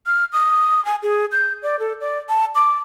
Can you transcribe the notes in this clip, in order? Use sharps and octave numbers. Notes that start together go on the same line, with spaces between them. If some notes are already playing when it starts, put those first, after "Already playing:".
F6
D#6
G#5
G#4
G6
D5
A4
D5
A5
D6